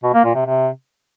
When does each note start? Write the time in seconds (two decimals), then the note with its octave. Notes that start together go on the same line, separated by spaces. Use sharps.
0.03 B2
0.14 A#3
0.24 A#2
0.35 C3
0.45 C3